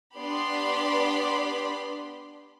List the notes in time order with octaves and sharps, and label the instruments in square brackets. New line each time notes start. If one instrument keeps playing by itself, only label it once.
[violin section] B3 D4 G4 D5 B5 C6